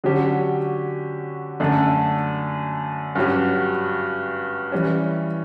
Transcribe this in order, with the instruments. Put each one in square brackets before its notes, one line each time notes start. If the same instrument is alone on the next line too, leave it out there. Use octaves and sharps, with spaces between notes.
[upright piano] D3 F#3 C#4 G4
F#2 D3 A3 D4
G2 F#3 C#4 G4
E3 G3 C#4